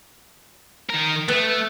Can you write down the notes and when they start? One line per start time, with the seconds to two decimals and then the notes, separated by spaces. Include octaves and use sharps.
0.89 D#3 A#4
1.28 A3 B3